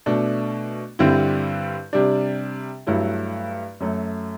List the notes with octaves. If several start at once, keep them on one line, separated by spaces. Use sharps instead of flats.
B2 A3 D4
G2 D3 G3 C4 E4
C3 G3 D4
G2 F#3 A3 E4
F#2 F#3 A3